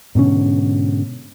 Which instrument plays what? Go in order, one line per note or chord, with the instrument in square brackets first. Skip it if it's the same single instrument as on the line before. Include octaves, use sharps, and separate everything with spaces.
[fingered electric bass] G#2 B2 D3 C#4